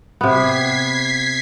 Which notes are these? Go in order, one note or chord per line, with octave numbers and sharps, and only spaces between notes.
C3 B3 G#6 B6 C7